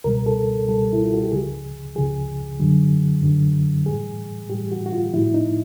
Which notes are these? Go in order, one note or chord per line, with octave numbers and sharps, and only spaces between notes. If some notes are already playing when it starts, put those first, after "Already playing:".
C#2 B2 G3 A#4
A4
C#2 B2 G3 A4
E4
F4
F#4
G4
C#2 C#3 F3 G#4
C#2 C#3 F3 G#4
F#2 D3 F#3
F#2 D3 F#3
A2 E3 G3 G#4
A2 E3 G3 G4
F#4
F#4
F4
A2 F3 E4
D#4